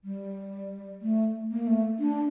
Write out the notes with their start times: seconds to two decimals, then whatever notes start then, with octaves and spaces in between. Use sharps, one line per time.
0.04 G3
1.02 A3
1.51 A#3
1.67 A3
1.99 D4